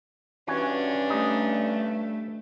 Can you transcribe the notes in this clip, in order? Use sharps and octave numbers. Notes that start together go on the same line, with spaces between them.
G2 E3 C#4 D4 F#4 G#5
G3 A3 D#4 D#5